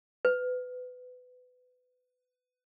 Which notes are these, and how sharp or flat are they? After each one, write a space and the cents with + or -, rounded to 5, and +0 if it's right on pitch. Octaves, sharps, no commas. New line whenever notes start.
B4 +25